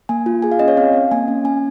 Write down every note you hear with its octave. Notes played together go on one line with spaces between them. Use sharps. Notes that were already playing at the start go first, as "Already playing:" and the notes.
A#3 G#5
F4
G#4 G#5
F5
C#4 D#5
C#5
C4 F5
C4
A#3 G#5
C#4
C#4 G#5